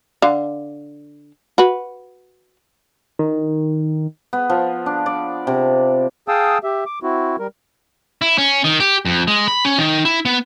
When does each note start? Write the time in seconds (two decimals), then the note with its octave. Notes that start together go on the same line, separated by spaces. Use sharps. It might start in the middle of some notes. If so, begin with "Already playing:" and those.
0.22 D3 F5
1.58 F#4 B4
3.19 D#3
4.33 B3
4.50 F3
4.86 D4
5.06 D5
5.47 C3
6.28 G#4 F5 G5 A5 D#6 E6
6.64 G4 E5
6.86 D6
7.03 C4 E4 F#4
7.39 G3 A#4
8.22 E4
8.38 C#4
8.64 D#3
8.80 G4
9.05 F2
9.28 G#3
9.48 B5
9.65 C#4
9.78 D#3
10.05 E4
10.25 B3